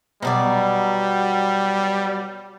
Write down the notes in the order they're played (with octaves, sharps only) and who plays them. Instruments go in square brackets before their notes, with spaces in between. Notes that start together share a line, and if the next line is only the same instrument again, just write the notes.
[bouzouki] B2 F#3 D5 [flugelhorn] G3